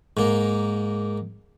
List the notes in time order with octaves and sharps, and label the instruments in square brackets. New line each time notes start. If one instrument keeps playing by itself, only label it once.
[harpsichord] G#2 A#3